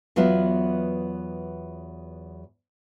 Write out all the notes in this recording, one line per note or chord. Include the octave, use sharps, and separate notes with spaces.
E2 F#3 B3 F4 B4 E5